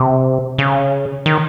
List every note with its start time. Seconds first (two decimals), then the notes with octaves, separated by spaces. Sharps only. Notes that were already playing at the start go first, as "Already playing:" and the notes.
Already playing: C3
0.58 C#3
1.26 D#3